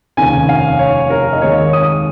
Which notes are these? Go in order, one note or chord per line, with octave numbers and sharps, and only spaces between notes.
F1 D#2 C#3 G#5
F5
C#5
A#4
D#5
D#2 D#3 G#3 C#5
D#6